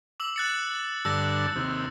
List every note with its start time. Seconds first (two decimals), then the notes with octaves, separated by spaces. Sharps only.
0.20 D6 E6 F#7
0.36 F#6 A6 C#7
1.05 G2 D3 A5 E6 A#6
1.56 D#2 C3